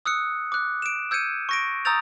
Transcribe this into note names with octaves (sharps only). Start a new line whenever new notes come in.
D#6 E6 F#6 C#7
D6 F#6
D7 E7
E6 G6 G#6 C#7 D#7
C#6 A#6 D7
A#5 D#6 E6 G6 A6 F7